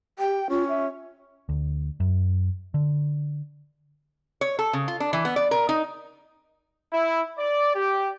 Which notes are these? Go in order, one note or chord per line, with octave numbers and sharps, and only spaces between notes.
G4 G5
C#4 F4
E5
D2
F#2
D3
C#5
A4
C#3
F4
D4
E3
B3
D5
A#4
D#4
E4
D5
G4